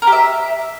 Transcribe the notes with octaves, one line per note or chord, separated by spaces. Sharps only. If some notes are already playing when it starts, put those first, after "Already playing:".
A#4
G4
E5